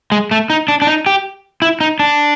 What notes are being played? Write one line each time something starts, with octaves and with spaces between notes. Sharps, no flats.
G#3
A3
D#4
D4
D4
D#4
G4
E4
D#4
D4